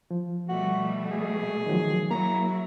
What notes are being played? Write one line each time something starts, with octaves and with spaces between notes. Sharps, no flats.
F3
B2 G3 A3 F#4
G#4
D#3 F3 F#3
F#3 A#3 E4 A#5